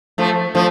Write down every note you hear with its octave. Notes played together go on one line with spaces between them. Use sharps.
F3 A3
F3 A3